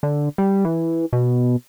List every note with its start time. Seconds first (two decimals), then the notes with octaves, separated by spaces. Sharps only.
0.03 D3
0.38 G3
0.65 E3
1.13 B2